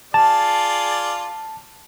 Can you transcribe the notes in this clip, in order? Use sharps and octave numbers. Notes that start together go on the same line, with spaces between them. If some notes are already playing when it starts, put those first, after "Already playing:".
F4 G#4 D5 A5